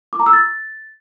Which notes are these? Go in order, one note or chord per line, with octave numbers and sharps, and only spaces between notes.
D6
A#5
E6
A6